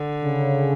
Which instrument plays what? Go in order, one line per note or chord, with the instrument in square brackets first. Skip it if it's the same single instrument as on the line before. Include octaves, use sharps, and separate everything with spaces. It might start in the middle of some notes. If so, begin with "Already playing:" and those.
Already playing: [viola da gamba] D3
[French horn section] C#3